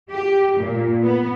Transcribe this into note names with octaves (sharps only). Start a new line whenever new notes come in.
G4
A#2
B3